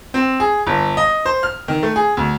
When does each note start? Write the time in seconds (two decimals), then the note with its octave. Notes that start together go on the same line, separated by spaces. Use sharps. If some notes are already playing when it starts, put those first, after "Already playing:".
0.14 C4
0.40 G#4
0.67 G1
0.97 D#5
1.25 C5
1.43 F6
1.68 D#3
1.83 A3
1.96 G#4
2.17 D2